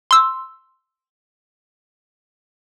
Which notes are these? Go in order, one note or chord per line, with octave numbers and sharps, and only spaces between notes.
C6 E6